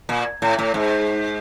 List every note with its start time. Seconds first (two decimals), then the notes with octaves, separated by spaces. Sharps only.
0.09 A#2
0.42 A2
0.59 A2
0.74 G#2